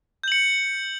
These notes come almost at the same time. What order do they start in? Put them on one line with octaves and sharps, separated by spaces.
G6 F#7 C#7